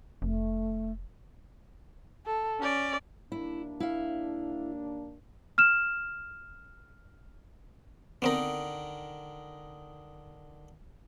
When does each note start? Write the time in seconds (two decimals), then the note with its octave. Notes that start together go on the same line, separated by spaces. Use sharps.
0.22 F1 A3
2.26 A4
2.60 C#4 D5
3.32 D#2 A#3 D4 E4
3.80 E4 F5
5.58 F6 E7
8.22 D3 D#3 B3 C4 D#4 A#4